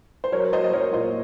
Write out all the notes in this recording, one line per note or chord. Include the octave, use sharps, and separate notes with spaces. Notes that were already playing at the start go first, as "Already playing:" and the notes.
C5
F#3 A#4 C#5
F#3 C5 D#5
D#5
F#3 A#4 C#5
A#2 C5 D#5